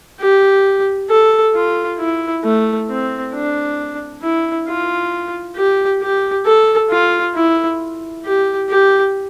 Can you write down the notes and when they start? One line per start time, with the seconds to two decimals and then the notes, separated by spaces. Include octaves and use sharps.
0.20 G4
1.10 A4
1.55 F4
1.99 E4
2.44 A3
2.89 C4
3.34 D4
4.22 E4
4.68 F4
5.56 G4
6.02 G4
6.46 A4
6.90 F4
7.35 E4
8.25 G4
8.69 G4